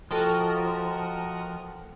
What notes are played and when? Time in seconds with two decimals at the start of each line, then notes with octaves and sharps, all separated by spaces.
0.11 F3 F#4 A4 A#4 D#5 G5